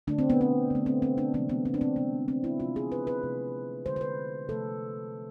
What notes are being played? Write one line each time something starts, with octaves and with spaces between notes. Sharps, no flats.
D3 A3 D4
C4
B3
C4
D3 A3
C4
C4
D4
C3 E3 G#3 C4
B3
C4
D4
C4
C3 G#3 B3
C4
E4
C3 F3 G#3 F4
G#4
B4
B4
C3 F3 A3
D3 G#3 C5
C5
B4
C3 F3 A3 A4